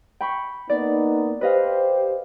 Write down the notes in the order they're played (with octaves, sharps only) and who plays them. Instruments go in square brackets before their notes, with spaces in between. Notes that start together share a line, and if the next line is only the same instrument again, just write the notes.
[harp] G5 B5 C#6
[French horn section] A#3 B3 D#4 [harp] D5
[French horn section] G4 C5 [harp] B4 D#5 F5